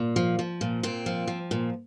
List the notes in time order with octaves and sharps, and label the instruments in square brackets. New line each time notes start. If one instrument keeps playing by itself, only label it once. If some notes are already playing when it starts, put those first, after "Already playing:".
Already playing: [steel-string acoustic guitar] A#2
F3
F3
A#2
A#2 C4
F3
F3
A#2